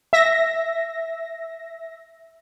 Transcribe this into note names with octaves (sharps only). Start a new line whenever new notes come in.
E5 A#6